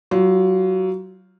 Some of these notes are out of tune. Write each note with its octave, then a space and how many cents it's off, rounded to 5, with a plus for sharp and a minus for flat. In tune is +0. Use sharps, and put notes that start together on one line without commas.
F#3 +20 F4 +0